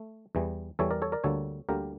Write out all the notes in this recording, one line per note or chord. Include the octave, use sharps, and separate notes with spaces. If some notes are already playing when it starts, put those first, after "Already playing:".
Already playing: A3
E2 E3 G3
E2 E3 G3 A4 C#5
A#4 D5
A4 C#5
A#4 D5
D2 D3 G3 A#3 A4 C#5
D2 D3 G3 A#3 G4 A#4